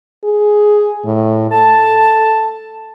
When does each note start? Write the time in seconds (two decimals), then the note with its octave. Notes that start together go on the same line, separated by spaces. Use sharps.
0.24 G#4
1.05 A2
1.51 A4 A5